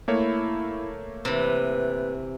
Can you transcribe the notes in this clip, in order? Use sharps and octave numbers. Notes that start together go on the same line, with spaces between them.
A3 A#3 E4 C#5
C3 E3 B4